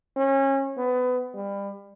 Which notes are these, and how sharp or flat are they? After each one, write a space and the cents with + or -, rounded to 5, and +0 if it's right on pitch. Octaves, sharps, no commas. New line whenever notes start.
C#4 -30
B3 +25
G3 +30